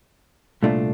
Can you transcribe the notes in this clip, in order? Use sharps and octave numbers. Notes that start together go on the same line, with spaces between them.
C2 A#2 A3 D4 F4